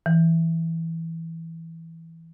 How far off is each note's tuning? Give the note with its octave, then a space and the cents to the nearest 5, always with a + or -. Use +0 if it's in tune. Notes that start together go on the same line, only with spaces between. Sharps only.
E3 -5